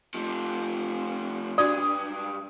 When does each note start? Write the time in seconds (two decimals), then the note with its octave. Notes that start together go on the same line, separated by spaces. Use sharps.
0.14 F3 A3
1.58 G2 D4 F#4 D5 D#6